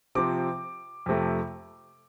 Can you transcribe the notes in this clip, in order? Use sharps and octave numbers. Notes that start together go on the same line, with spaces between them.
C3 F3 C4 D6
F2 C3 A3